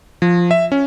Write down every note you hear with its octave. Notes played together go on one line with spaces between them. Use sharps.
F3
E5
C#4